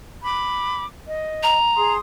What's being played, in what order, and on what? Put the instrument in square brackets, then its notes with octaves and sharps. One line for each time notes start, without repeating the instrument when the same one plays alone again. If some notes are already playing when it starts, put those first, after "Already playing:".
[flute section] B5 D6
D#5
[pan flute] A#5
[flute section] G#4 C6 D#6